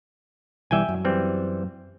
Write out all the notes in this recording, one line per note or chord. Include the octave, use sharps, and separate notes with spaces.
B1 E3 G3 E5 G5 G#5
F#2
E3 G3 C4